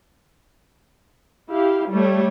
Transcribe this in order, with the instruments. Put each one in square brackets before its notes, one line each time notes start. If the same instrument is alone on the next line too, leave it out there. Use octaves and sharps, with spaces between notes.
[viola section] E4 G4 F5
G3 A3 C#5